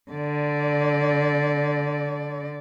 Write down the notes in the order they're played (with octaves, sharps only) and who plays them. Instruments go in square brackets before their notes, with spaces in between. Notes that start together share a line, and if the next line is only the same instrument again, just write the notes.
[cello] D3 D5